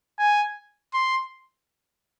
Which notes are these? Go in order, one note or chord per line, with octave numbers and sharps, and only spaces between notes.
G#5
C6